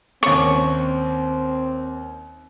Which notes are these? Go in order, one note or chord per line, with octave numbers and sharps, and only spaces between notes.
D#2 C4 C#4 C#6 D6